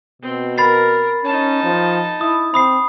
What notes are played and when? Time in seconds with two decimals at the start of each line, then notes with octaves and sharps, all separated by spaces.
0.22 B2 C4
0.58 A#4 B5 A6 C7
1.24 C#4 D#4 A5
1.64 F3
2.21 E4 D#6
2.54 C4 B5 D#6 C7